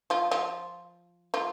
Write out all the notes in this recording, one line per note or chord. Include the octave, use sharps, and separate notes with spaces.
F3 F4
F3 F4
F3 F4